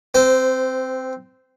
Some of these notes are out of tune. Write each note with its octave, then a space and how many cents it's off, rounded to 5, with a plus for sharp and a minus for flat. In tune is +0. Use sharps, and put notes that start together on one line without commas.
C4 +0 C5 -20